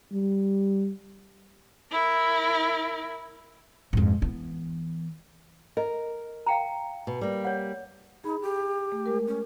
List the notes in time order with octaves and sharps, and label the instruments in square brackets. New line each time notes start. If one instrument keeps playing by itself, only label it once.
[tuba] G3
[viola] E4 A#4
[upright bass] F2 G#2
E3 B3
[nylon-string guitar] A#4 [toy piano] D#5
[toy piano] F5 G5 A#5
[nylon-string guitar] B2
G3 A#3
[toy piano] C#5 F#5
[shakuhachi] D#4 [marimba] G#4 B5
[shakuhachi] G4
[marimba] A3
G#3 A#4
[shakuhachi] C#4